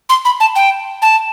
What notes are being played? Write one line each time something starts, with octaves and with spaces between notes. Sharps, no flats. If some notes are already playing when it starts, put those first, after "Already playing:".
C6
B5
A5
G5
A5